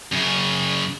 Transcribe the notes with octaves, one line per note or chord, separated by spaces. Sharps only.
F#2 C#3